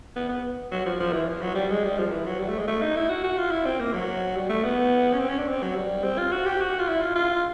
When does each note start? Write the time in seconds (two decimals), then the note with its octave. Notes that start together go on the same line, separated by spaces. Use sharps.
0.16 B3
0.29 B3
0.72 F#3
0.86 F3
1.00 F3
1.13 E3
1.28 F3
1.42 F#3
1.55 G3
1.70 G#3
1.84 G3
1.98 F3
2.11 E3
2.26 F#3
2.40 G3
2.49 A3
2.59 G#3
2.68 A3
2.82 D#4
2.96 E4
3.09 F#4
3.24 F#4
3.38 F4
3.51 E4
3.66 C4
3.80 A#3
3.94 F#3
4.36 G3
4.49 A3
4.64 B3
5.13 C#4
5.20 C4
5.30 C#4
5.39 D4
5.48 C4
5.63 F#3
5.76 G3
6.04 C4
6.18 F4
6.32 F#4
6.46 G4
6.61 F#4
6.79 F4
6.89 E4
7.02 F4
7.16 F4